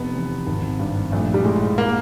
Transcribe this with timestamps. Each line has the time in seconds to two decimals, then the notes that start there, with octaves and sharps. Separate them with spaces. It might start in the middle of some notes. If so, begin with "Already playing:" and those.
Already playing: F1 B3
0.15 E2
0.47 G#1
0.79 G2
1.12 A#1 A3
1.34 G3
1.45 A2 G#3
1.78 A#3